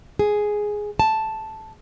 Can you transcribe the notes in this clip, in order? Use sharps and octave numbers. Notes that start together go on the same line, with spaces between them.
G#4
A5